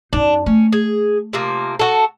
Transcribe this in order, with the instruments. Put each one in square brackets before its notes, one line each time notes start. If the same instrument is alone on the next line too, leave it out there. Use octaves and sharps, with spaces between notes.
[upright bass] F#2 D#4 [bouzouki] D4
[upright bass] A3 [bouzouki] C#4
[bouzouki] G#4
C3 F3 A#3
F#4 A4